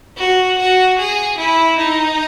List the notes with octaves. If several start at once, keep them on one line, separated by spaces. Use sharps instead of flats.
F#4
F#4
G#4
E4
D#4